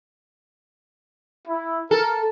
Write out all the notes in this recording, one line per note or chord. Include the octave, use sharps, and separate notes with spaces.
E4
A4 A#4